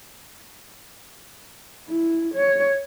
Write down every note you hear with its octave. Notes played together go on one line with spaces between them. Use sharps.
E4
C#5